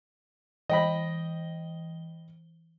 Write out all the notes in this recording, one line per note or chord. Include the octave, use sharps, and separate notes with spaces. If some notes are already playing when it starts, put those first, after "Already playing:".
E3 D#5 G5 B5 G7